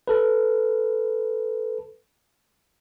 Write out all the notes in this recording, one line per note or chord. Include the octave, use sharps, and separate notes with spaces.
A4 B4